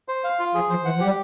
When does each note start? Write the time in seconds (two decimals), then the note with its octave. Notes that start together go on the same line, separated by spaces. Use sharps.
0.08 C5
0.24 F5
0.39 F4
0.54 F3 G#4
0.70 F3 C5
0.85 E3 F#5
0.96 F3
1.00 G3 G4